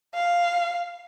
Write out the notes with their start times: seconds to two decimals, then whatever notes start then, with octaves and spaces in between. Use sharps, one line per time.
0.15 F5